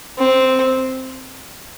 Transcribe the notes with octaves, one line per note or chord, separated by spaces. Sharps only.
C4